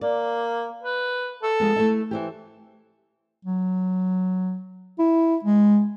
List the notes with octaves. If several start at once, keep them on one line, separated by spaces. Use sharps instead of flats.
A#3 D5
B4
A4
F3 G#3 B3
A3 E4 E5
E3 G4 C5 E5
F#3
E4
G#3